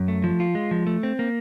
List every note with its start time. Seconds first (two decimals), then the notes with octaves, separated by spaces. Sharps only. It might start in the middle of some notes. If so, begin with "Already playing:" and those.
Already playing: F#2
0.08 A3
0.24 F3
0.40 F4
0.55 G#3
0.71 F3
0.87 A3
1.03 C4
1.19 A#3